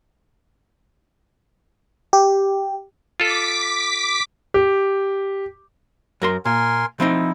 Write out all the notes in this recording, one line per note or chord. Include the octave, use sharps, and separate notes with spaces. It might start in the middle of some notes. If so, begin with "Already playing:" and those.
G4
F4 A4 D6 B6
G4
F#2 A#4 C6
A#2 A#4 G#5 C6
F3 C4 D#4 E4